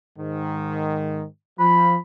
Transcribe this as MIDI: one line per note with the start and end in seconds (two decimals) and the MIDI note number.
0.18 1.25 44
0.18 1.25 51
1.59 1.96 53
1.59 1.96 83